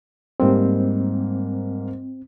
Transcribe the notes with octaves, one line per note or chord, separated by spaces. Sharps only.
G#2 G3 A#3 C4